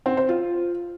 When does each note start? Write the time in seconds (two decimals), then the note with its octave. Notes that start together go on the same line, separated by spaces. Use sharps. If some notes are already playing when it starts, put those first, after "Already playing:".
0.06 C4
0.17 C5
0.29 F4